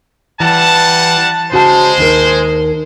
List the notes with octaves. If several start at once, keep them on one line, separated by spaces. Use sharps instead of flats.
E3 G3 F#5 A5
C#3 G#3 F#4 C5 A5
D#2 D#4 A#4